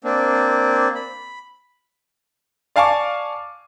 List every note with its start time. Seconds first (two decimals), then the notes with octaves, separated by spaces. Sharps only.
0.04 A#3 C4 D4
0.95 B5
2.76 D5 F5 G#5 A5 C#6 D6